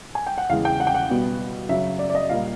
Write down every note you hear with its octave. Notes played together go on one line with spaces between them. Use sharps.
G#5
G5
F#5
E2 C#3 E3 G#3 F5
G5
F#5
G5
F#5
B2 G3 B3
F#2 C#3 F#3 E5
D5
D5
D#5
A#2 G3 A#3 F5